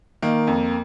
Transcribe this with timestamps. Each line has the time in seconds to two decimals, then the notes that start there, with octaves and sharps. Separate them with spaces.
0.22 D#3 A#3
0.47 F2